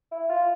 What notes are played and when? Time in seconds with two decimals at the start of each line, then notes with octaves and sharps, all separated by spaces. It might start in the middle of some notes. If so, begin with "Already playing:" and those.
0.11 E4
0.30 F4